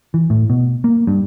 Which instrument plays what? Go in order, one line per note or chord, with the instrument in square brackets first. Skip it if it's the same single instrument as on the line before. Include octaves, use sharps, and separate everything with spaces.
[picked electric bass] E3
A2
B2
A#3
G2